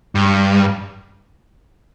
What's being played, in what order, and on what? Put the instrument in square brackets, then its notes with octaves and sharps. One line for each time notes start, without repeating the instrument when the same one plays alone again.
[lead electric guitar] G2